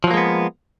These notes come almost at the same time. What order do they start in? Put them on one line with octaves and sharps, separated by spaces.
F3 F#3 A#3 G#3 B3